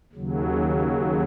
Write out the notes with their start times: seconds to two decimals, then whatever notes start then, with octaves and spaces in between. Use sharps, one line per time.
0.12 D#2 C#3 F#3